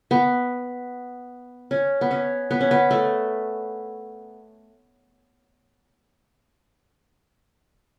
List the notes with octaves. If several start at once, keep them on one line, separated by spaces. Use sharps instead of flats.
B3
C#4
B3
C#4
B3
C#4
B3
A3